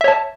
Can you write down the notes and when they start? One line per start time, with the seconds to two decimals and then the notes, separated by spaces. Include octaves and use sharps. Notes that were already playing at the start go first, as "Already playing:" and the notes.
0.01 E5
0.04 C#5
0.08 A5